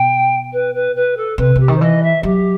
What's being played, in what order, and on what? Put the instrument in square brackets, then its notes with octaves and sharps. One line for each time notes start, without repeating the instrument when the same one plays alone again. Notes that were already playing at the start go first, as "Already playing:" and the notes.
Already playing: [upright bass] B2 [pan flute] G5
[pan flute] B4
B4
B4
A4
[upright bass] C3 [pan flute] B4
[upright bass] C3 [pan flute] G4
[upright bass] D#3
[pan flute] C5
[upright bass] E3 [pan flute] D#5
[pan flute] E5
[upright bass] F#3 [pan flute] G4